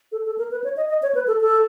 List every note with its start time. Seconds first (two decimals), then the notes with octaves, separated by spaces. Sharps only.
0.12 A4
0.26 A4
0.38 A#4
0.51 B4
0.64 C#5
0.77 D#5
0.89 D#5
1.03 C#5
1.15 B4
1.27 A4
1.41 A4